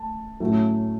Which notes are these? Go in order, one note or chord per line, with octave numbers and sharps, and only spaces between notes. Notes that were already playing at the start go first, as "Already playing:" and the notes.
Already playing: A3 A5
A2 F#3 A3 C#4